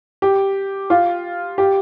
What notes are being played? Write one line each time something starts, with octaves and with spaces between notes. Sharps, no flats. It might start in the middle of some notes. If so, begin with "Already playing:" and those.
G4
F4
G4